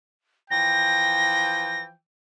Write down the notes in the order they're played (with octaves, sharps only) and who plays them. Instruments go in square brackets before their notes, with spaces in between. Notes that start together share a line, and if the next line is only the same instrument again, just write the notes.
[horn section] E3 F3 G5 [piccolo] A#6